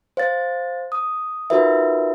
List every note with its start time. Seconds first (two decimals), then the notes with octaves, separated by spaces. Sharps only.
0.17 C5 F5 A6
0.92 D#6
1.50 D#4 F4 F#4 A#4 B4 E5